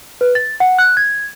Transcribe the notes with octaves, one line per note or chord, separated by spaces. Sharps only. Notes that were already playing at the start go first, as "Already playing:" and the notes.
B4
A6
F#5
F#6
G#6